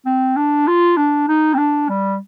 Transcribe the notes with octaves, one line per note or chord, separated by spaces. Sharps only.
C4
D4
F4
D4
D#4
C4
D4
G3